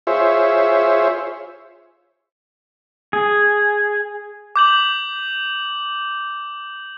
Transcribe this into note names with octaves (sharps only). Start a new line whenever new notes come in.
F4 G#4 C5 C#5 E5
G#4
D6 G6 F#7